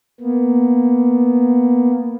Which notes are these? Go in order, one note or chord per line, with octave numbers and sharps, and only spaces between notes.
A#3 B3